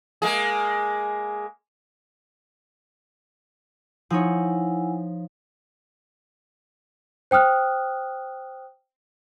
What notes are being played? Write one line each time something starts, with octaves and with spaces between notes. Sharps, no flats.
G#3 A#3 G#4
F3 D#4 E4 C#5 F#5 G#5
C5 G5 D#6 F6 F#6